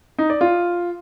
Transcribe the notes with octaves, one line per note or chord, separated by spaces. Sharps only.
D#4
D5
F4